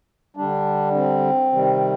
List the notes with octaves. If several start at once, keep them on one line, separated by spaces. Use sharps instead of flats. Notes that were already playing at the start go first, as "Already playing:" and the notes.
D3 G3 D4
C4
C3 D#3 G3